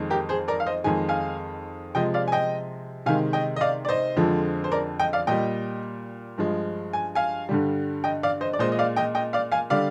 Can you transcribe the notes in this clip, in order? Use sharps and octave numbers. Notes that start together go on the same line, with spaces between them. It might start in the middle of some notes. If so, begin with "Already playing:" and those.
Already playing: F2 D#3 G#3
G4 A#4
G#4 C5
A#4 D5
F5
C5 D#5
F2 D#3 G#3 G#5
F5 G#5
C3 F3 G#3 D#5 G5
D5 F5
G#5
D#5 G5
C3 D#3 G#3 F5 G#5
D#5 G5
D#5
D5 F5
D5
C5 D#5
F2 D3 F3 G#3
C5
A#4 D5
D#5 G5
D5 F5
A#2 G3 D#5 G5
G2 F3 G#3
G#5
F5 G#5
G2 D3 G3
D#5 G5
D5 F5
C5 D#5
D5
A#2 G#3 C5 D#5
D#5
D5 F5
D#5 G5
D#5 G5
D5 F5
F5 G#5
D3 G3 D5 F5